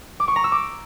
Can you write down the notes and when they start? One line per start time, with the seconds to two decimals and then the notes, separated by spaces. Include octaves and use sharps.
0.20 D6
0.28 C#6
0.36 A#5
0.44 E6
0.52 D6